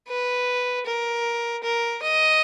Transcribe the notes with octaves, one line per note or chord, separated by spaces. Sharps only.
B4
A#4
A#4
D#5